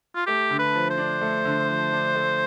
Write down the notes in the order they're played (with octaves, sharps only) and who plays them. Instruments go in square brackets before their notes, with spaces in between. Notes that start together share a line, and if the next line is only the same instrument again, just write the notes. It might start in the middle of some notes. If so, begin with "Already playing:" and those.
[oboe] F4
[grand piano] A3 [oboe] G4
[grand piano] D3
[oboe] B4
[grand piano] F3
[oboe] C5
[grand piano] D4
A3
D3
F3
D4
A3